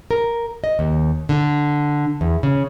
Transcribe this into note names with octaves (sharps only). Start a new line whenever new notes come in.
A#4
D#5
D#2
D3
E2
C#3